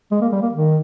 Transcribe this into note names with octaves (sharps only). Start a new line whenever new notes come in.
G#3
A#3
G3
A#3
D#3